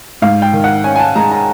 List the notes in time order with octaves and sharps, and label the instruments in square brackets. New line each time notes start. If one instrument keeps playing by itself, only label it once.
[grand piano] G#2 F5
G5
D#3
F#5
C#4 G#5
G#5
A5
G#3 A#5
A#5